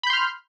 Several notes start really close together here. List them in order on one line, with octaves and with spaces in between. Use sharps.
B5 G6 C6 F6